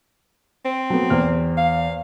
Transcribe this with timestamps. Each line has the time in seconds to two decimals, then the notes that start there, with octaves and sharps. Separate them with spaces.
0.65 C4
0.90 F#3 A3 B3
1.10 E2 C5 F6
1.58 F5